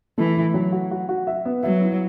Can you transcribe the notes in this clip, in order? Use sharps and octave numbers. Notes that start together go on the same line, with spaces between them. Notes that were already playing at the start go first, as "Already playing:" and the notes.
E3 A3
A3
F#3
F#4
F#4
F#4
E5
B3
F#3 E5
E4